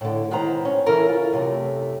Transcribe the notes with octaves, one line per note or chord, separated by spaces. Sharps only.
A2 D3
B2 D#3 G#3 B4 C5 A#5
C#4
C#3 E3 C#4 E4 A4 A#4
F4
F#2 C3 A3